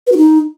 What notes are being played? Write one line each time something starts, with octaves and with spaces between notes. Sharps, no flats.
B4
F#4
D#4